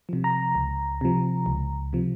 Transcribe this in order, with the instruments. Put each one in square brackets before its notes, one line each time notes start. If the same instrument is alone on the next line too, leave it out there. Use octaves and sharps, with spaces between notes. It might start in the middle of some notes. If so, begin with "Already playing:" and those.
[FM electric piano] C3 F3
A#5
C#2
C3 F3
C#2
C3 F3